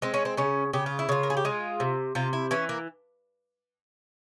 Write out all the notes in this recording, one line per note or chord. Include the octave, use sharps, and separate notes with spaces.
G#3 C4
C#4
C4
C#3 C#4
C#3 G4
F4
E4
C#3 F4
A#4
G#4
G4
G#3 F4
C3
C3 F4
E4
E3 C#4
A#3